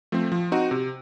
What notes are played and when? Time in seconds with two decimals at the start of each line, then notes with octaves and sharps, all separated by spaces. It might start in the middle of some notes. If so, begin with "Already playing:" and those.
0.12 F3 A3 C4
0.32 F3
0.52 C4 D#4 F#4
0.71 C3